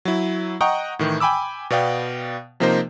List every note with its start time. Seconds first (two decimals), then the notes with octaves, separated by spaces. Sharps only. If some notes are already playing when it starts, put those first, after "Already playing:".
0.05 F#3 E4
0.61 D#5 F#5 G5 A#5 C#6 D#6
0.99 A2 D#3 E3
1.20 G5 G#5 B5 D6 E6
1.70 B2 B3 D5 F5 G5
2.60 C3 F3 A#3 D#4 A#4 C5